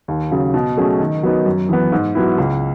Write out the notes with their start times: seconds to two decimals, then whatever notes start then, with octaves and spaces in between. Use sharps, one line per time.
0.08 D#2
0.31 C#3 F#3
0.54 B2
0.77 F#3 A3 C#4 G#4
1.00 D#3
1.23 F#3 B3 D#4
1.46 F#2
1.69 E3 B3
1.92 G#2
2.15 F#3 B3 E4
2.38 C#2